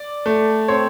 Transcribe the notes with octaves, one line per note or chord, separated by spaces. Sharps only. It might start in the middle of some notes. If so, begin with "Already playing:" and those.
Already playing: D5
A3
C4 C#5